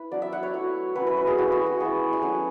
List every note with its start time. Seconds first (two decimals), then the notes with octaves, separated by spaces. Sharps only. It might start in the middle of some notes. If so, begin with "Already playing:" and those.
Already playing: E4 B4
0.11 F#3 B3 D4 D5
0.22 E5
0.33 F#5
0.43 C#5
0.53 F#3 A3 E4
0.95 F#3 C#4 E4 B4
1.07 B4
1.17 B4
1.27 G#4
1.38 A3 C#4 E4 F#4
1.52 F#4
1.66 F#4
1.80 G#3 B3 E4 G#4
2.13 G#5
2.22 F#3 A3 C#4 F#5